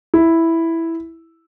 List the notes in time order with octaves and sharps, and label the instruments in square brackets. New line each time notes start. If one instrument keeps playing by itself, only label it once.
[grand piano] E4